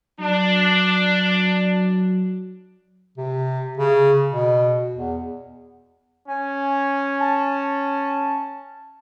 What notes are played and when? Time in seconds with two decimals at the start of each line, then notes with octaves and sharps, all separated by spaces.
0.20 F#3 D4
3.17 C3
3.77 C#3
4.32 B2
4.95 E2
6.28 C#4 G#5
7.20 A5